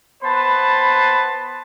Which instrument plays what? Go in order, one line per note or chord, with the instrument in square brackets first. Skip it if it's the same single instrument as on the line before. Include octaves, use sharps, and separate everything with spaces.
[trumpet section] B3 B4 C5 A5 B5